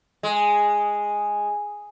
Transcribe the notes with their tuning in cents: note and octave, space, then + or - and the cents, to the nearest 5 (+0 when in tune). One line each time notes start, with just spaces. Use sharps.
G#3 -5